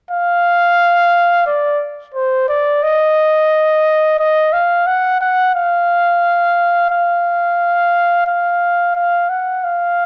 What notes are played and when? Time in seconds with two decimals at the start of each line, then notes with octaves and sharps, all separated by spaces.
0.11 F5
1.47 D5
2.14 C5
2.49 D5
2.83 D#5
4.19 D#5
4.53 F5
4.87 F#5
5.21 F#5
5.55 F5
6.91 F5
8.27 F5
8.96 F5
9.29 F#5
9.64 F5